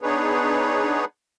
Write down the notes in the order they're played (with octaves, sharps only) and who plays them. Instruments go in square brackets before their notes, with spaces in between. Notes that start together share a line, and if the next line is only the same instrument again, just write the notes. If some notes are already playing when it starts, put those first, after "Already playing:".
[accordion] B3 D4 D#4 G#4 B4 C#5